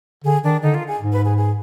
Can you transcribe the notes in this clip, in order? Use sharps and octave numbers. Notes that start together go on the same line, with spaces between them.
D3 G#4
D#3 D4
D3 D#4
F4
G#4
G#2
B4
G#4
G#4